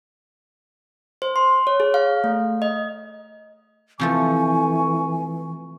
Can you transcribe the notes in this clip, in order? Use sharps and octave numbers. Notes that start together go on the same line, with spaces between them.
C5
C6
C#5
G#4
F5
A3
D#5
C3 E3 F3 A3 G#5 C#6